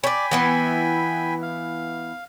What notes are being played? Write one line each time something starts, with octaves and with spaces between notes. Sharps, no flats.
C#5 D5 G5 G#5 B5
E3 B3 E4
F5